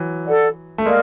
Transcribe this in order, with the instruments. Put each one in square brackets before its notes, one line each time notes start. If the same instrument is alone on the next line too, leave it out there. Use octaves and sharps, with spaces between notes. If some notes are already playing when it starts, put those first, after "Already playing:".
Already playing: [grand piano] E3 F#3
[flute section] A4 D5 F#5
[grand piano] A3
[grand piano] G#3 A#3 [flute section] A#4 D5 F5